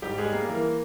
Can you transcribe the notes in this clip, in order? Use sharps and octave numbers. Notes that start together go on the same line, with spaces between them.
G#2 G3 G4
G#3 G#4
G3
A#3 A#4
E3 A#3 A#4